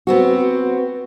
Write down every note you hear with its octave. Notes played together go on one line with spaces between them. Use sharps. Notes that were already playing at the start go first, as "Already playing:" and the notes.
B3 C4 F#4